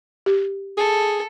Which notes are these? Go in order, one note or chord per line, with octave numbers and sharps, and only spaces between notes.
G4
G#4 A4